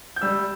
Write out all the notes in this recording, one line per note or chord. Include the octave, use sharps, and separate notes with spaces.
G6
G3 E6